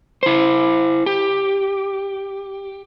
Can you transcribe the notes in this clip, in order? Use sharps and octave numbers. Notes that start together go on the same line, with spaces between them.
E4 C5
G4